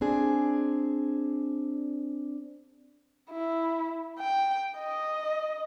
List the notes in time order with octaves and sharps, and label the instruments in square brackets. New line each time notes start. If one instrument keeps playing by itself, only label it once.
[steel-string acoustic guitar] C4 D4 G#4
[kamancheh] E4
G5
D#5